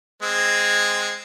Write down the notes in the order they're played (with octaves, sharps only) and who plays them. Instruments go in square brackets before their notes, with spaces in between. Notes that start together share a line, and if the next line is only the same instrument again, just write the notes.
[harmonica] G#3 C4